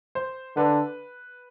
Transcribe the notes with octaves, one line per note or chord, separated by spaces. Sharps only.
C5
D3 B4